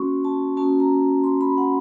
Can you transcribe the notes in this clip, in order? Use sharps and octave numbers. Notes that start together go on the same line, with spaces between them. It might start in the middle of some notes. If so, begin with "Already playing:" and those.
Already playing: A#3 C#4 F#4 C6 C#6
A5
A#3 C#4 F#4 A5
A#5
C6
B5
F#5